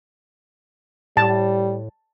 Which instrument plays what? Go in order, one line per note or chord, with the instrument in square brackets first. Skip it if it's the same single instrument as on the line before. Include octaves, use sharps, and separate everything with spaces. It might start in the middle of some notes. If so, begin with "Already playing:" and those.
[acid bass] A2 [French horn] G3 [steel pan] A5